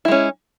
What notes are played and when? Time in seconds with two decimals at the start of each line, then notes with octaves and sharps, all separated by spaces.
0.05 E4
0.08 G#3
0.11 C#4